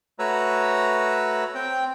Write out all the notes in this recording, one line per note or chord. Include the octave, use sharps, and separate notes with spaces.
A3 F#4 B4 C#5 A#5 E6
C4 G5